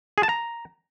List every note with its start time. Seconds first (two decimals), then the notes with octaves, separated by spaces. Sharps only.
0.18 G#4
0.23 A5
0.29 A#5